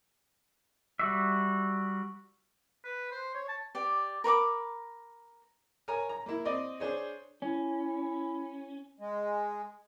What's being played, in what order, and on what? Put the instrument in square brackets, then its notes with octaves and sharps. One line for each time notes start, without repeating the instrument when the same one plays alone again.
[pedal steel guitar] G3 F#4 E5
[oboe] B4
C5
C#5
A5
[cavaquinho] G4 D5
A#4 B5 C#6 D6
[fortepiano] A#4 C#5 G#5 A#5
A#5
A#3 E4
C4 D5 D#5
D4 G#4 C5 C#5
[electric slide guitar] C#4 [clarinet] E4
[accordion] G#3